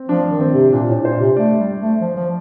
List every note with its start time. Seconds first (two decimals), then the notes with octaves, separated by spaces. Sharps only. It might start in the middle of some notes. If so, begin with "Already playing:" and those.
Already playing: C4
0.09 F3 D4
0.30 D#3
0.41 C4
0.52 C3
0.72 A#2 D4
0.89 A2
1.05 A#2 C5
1.20 C3
1.37 A3 D5
1.59 G3
1.80 A3
2.01 F3
2.17 F3